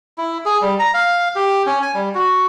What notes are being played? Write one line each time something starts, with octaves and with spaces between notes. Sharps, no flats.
E4
G#4
G3
A#5
F5
G4
C#4
G#5
G3
F#4